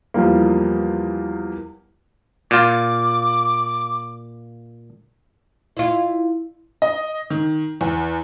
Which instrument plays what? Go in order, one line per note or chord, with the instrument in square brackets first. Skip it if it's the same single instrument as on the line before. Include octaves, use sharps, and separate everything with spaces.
[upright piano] E2 F3 G3 A#3
[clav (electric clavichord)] A#2 F4 [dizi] D6
[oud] E4 F4
[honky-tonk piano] D#5
D#3
E2